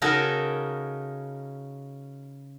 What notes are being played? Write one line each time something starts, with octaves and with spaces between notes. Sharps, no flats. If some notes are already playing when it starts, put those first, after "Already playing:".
C#3 C#4 D#4 F#4 A4 A#4